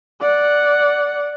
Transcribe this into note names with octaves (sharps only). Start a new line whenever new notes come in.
D5 F#5